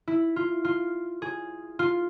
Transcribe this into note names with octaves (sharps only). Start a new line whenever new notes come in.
E4
F4
F4
G#4
F4